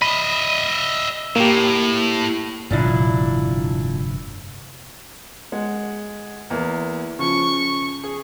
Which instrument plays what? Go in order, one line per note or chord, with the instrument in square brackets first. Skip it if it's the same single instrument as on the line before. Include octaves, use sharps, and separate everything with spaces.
[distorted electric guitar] D#5 E5 [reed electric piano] B5
[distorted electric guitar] A2 [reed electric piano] A#3 G4
[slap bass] F1 G2 D3 [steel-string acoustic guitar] A#2 D4 E4
[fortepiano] G#3 F#5
E2 A#3
[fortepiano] C#3 F3 [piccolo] C#6
[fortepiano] G#4